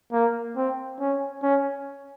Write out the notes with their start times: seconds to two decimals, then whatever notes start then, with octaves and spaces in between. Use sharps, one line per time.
0.12 A#3
0.56 C4
1.00 C#4
1.43 C#4